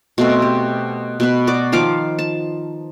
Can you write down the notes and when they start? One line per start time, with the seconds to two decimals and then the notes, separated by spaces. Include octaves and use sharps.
0.18 B2 A3 C4
0.42 G4
1.20 B2 B3 B4
1.47 F#4 D5 D6
1.72 D#3 F3 F5 D6
2.19 A5